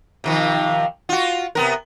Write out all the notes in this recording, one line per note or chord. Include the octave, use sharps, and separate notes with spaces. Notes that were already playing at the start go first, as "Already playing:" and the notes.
C3 D#3 F3
F4 F#4
C3 B3 A#4